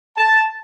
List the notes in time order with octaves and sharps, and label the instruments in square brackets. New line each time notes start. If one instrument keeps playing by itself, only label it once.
[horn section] A5